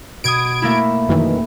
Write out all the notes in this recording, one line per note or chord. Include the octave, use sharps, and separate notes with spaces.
B2 D#6 G#6 D7
A3 A#3 E4
F#2 D#3 E3